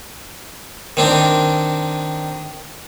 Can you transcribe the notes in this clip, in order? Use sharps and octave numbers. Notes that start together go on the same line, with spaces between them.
D#3 C4 D4